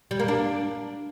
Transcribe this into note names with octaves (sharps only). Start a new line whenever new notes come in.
G3
A#3
D4